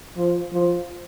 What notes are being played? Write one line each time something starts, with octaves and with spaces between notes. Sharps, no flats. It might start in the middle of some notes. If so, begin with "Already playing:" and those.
F3
F3